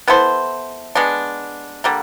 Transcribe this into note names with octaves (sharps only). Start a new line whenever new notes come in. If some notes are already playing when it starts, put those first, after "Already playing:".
B3 E4 A4 C5
G#3 B3 D4
D3 G3 A#3